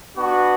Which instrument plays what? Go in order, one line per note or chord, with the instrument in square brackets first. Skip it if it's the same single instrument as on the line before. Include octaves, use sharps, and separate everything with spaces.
[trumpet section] B3 D4 F#4